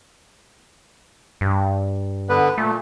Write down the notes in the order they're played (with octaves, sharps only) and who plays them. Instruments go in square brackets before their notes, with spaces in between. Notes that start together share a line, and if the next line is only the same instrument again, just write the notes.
[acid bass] G2
[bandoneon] D3 B3 B4
[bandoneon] A#2 [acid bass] A3